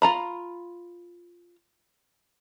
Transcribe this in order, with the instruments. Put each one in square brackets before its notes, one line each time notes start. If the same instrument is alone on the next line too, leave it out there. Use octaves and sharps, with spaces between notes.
[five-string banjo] F4 A#5 B5